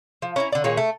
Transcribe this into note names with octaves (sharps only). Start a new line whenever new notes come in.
F3
C#4 E4 A#5
D3 D5
A#2 D#3 G#4 C#5
A3